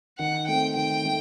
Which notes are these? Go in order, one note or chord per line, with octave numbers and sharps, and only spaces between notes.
D#3 F#5
A3 C4 G5
D#3 G5
A3